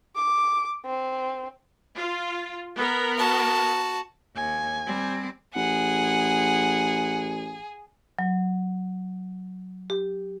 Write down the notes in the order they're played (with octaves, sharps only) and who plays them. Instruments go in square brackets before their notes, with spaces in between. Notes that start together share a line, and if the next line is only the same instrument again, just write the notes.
[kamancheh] D6
C4
[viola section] F4
B3 A#4
[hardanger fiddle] F#4 A5
[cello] D#2 [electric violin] G#5
[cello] G3 C4
[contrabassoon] A1 [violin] G#4 [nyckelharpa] F#5
[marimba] F#3
G4